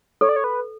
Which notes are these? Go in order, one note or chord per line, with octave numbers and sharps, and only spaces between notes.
A4 C#5
D5
C#5
B4